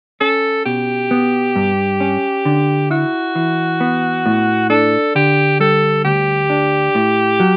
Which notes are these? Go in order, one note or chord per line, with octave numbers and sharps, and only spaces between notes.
C#4 A4
B2 G4
B3
G2
C#4
D3
E4 F#4
E3
B3
A2
D4 A4
D3 G4
G3 A4
D2 G4
D4
A2
F#3